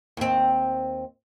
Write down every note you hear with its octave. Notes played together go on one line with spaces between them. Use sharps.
D#2 C4